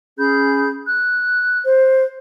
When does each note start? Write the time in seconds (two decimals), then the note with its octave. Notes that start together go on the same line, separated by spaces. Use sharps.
0.18 C#4 G#4 B5 G6
0.87 F#6
1.65 C5